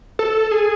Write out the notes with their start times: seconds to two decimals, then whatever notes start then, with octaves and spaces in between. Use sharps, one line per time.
0.19 A4
0.51 G#4